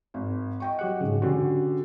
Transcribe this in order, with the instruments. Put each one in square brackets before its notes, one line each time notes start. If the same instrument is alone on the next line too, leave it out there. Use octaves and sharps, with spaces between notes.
[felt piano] G#1
D#5 G5 C#6
[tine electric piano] F#3 G4 F#5
G#2 C#3
[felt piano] D3 [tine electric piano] C#4 F#4 G4